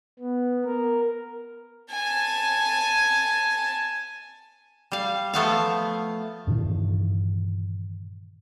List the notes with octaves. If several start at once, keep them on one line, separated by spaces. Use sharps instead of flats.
B3
A#4
G#5 A5
G3 F5
F3 A3 B3 F5
G2 A#2 D#3 E3